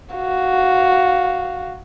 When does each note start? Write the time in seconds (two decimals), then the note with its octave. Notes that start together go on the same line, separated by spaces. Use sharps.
0.15 F#4 F5